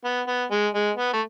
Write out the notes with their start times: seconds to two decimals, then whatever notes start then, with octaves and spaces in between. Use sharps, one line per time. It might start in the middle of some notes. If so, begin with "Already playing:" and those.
0.05 B3
0.28 B3
0.51 G#3
0.74 G#3
0.97 B3
1.13 A3